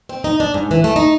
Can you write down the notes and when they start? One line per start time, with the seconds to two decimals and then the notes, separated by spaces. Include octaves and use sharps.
0.09 C4
0.24 D#4
0.40 D4
0.54 G#2
0.71 E3
0.84 A3
0.96 D#4